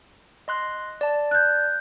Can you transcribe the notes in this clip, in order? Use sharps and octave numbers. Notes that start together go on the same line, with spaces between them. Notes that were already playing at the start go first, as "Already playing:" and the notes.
D#5 C6 F#6
D5 A5
F#6 G6